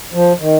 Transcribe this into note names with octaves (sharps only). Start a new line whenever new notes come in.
F3
D#3